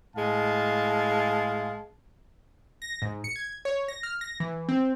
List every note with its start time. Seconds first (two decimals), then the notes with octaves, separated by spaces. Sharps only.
0.16 A2 G#3 F5 A5
2.82 A#6
3.02 G#2
3.24 C#7
3.36 G#6
3.65 C#5
3.88 A#6
4.03 F6
4.21 A#6
4.40 E3
4.69 C4